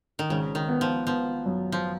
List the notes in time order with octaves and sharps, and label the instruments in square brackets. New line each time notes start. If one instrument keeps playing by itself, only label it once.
[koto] D#3
[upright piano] G#1 [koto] C#3
[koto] D#3
[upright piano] B3
[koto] F3
[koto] F3 [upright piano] B3
[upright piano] F#2
[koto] F3